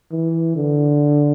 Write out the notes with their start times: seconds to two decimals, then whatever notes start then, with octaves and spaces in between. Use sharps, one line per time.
0.12 E3
0.56 D3